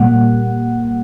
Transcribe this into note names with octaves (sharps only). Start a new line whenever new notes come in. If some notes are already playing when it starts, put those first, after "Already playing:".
Already playing: A#2 G3 A#3 F#5